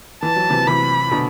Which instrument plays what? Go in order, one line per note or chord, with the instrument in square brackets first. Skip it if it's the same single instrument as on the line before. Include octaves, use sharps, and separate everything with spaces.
[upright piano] E3 [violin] A5
[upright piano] F#3
C3 E3
[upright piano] C3 E3 [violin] B5
[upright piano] B2 D3